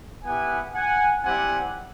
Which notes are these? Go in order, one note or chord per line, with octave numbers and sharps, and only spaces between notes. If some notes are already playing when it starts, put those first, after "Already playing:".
B3 E4 G4 F#5 G#5
F#5 G#5
G3 C4 E4 G4 F#5 G#5